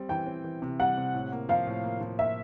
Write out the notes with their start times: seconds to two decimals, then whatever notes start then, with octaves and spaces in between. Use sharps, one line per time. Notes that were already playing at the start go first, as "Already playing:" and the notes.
Already playing: G3 C4
0.09 E3 G5
0.26 C4
0.44 E3
0.62 C3
0.80 G3 F#5
0.97 C3
1.14 A2
1.32 A#3
1.49 F3 F5
1.67 A2
1.84 A#3
2.01 F3
2.19 A#3 E5